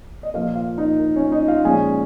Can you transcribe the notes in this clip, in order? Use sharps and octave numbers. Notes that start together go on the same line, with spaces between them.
D#5
A#2 F3 A#3 F4 F5
F4 F5
D#4 D#5
A#4
C#4 C#5
D#4 D#5
F4 F5
A#2 F3 G#3 C#4 G#4 G#5